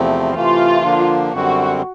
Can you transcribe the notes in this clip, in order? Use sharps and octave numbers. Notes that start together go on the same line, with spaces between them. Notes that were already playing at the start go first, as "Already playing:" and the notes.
Already playing: E2 C3 F3 A3 C4
C3 E3 A3 F4
D3 F3 A#3 D4
F#2 D3 G3 C4 F#4